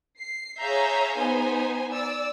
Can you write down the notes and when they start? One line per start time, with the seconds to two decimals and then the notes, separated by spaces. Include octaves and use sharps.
0.17 C7
0.58 G#4 C#5 E5 F5 A#5 G6
1.17 B3 D#4 C5 G#5
1.92 D5 E6